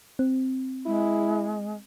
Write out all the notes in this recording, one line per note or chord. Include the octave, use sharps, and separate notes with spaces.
C4
G#3 E4